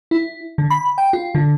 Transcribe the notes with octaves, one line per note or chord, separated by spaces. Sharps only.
E4
D3
B5
G5
F4
D3